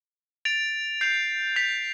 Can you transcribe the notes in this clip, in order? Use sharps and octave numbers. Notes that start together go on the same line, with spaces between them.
A6 D7 F7
G6 C7 F7
G6 B6 F7